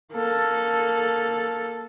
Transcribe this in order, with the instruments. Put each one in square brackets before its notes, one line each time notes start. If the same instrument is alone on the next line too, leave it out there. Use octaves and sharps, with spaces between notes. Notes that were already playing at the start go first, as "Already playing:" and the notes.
[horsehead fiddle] A#3 A4